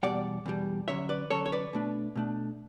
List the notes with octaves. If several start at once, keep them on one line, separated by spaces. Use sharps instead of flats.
E2 B2 G3 D5 F#5
E2 B2 G3
D3 F#3 C#4 C#5 E5
B4 D5
D3 F#3 C#4 A4 C#5
C#5
B4 D5
B2 A3 D4
B2 A3 D4